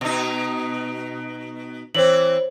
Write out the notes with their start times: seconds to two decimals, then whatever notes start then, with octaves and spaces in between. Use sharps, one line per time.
0.01 B2 D#4
1.95 E3 C4 C5 C#5 F#7